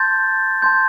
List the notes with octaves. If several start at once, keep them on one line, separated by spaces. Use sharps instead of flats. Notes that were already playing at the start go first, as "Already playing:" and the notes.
Already playing: A5 C6 G6 A6
A5 C6 G6